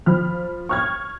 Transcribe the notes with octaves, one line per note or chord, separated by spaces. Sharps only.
F3 B5 F6
C#6 F6 G#6